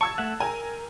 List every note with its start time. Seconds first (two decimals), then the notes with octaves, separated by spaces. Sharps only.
0.01 A5 C#6 E6 G#6
0.18 A3 E5 F#5
0.40 A#4 G5 G#5 A#5